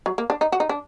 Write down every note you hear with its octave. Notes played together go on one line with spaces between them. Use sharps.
F#3
A#3
D4
D#4
F#4
D#4
D4